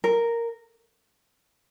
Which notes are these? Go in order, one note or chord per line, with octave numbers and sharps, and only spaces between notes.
A#4